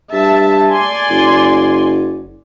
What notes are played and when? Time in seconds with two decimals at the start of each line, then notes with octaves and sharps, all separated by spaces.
0.13 G2 E5 A5
0.71 D5 G#5 C6
1.10 F#1